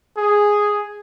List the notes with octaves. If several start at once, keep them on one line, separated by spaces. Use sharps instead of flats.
G#4